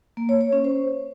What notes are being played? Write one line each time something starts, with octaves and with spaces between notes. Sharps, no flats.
A#3
C#5
C#5
C#4
C5